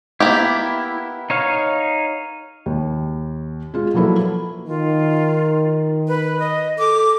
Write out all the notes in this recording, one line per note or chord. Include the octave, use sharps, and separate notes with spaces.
A#3 B3 E4 G4
D#4 C#5 F5
D#2
G#3 F4 G#4
F3 F#3 A#3 E4 A4 B4
D#3 F4
B4
D#5
A4 D6